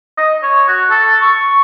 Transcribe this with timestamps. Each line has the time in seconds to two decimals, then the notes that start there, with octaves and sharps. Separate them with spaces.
0.17 D#5
0.43 C#5
0.68 F#4
0.90 A4
1.21 C#6